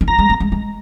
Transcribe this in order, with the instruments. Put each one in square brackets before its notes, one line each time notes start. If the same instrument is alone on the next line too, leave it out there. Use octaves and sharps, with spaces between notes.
[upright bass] D#3
[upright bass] F3 [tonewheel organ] A#5
[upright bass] G#3
A#3
G#3
G#3